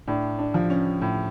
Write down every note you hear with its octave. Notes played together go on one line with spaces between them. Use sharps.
A2 D4
D4
F3
C#4
A2